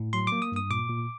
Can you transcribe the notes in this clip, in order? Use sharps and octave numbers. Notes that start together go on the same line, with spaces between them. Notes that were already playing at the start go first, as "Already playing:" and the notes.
Already playing: A2
F#3 C6
A#3 D6
D#6
G2 D#6
A#2 D6
A#2